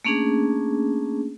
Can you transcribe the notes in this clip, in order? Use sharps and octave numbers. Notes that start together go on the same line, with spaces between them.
A3 A#3 C#4 D4 G#4